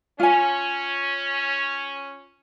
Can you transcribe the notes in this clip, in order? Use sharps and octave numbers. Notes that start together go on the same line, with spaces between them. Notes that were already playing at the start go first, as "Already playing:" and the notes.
C#4 F4 G#5